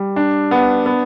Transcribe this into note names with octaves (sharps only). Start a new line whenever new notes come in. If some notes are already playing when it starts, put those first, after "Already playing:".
Already playing: G3
D4
B3
B3